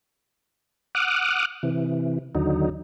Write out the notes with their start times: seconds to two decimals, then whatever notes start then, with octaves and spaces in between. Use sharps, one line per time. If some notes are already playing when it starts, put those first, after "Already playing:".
0.95 F#5 D6 D#6 F6 F#6
1.63 C3 E3
2.35 D#2 D3 F#3 D#4